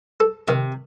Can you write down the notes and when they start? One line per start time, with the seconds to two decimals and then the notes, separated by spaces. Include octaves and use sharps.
0.20 A4
0.48 C3 D#3